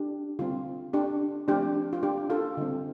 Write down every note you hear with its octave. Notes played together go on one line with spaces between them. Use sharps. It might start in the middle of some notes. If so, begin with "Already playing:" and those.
Already playing: D4 G4
D3 G3 C4 F4
D4 G4
F3 A3 C4 D4 G4
F4
D4 G4
F4 A4
D3 G3 C4